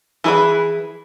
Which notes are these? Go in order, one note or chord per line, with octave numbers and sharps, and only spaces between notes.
E3 E4 G#4 B4 B5